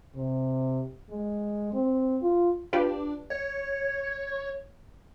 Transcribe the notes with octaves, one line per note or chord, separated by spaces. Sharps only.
C3
G#3
C4
F4
D4 F4 G4 B4
C#5